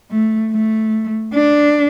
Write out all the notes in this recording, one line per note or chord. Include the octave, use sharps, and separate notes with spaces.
A3
A3
D4